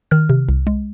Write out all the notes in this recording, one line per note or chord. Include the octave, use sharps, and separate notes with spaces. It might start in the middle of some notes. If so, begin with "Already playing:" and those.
D#3 F6
C3
C2
G#3